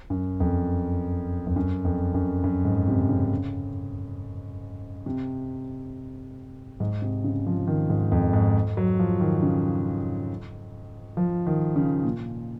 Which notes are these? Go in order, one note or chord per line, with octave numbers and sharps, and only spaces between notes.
F#2
F2
F2
F#2
F2
F#2
F#2
G#2
C3
C#3
C3
G#2
C3
C#3
F3
D#3
G#2
F2
G#2
F#3
F3
D#3
C#3
F3
D#3
C#3
A#2